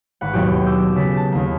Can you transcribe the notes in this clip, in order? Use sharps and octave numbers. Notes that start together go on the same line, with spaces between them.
G#1 B4 F#5
D#2 B2 F#3 G4
D6 E6 G6
C#3 A4 B6
A5
D#2 A#3